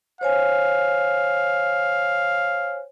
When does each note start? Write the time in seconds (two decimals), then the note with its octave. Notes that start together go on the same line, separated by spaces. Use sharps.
0.21 C5 C#5 F5 G#5